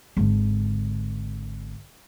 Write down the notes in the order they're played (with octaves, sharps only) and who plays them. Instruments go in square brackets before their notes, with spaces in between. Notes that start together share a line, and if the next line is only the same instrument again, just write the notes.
[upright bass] G#1 D3